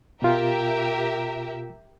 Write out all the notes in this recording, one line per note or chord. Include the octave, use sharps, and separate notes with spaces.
B2 F4 G4 A#4 E5